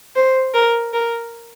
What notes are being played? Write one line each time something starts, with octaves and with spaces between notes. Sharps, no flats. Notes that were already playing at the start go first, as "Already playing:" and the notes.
C5
A#4
A#4